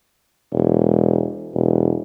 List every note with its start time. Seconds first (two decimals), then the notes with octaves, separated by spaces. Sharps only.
0.53 E1
1.54 E1